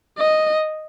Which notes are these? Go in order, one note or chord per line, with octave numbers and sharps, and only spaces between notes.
D#5